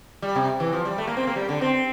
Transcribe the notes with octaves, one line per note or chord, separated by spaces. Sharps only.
G3
C3
E3
F3
G3
A3
A#3
C4
A#3
G3
D3
C4